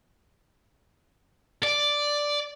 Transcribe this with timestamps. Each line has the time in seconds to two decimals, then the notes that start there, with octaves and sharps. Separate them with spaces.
1.63 D5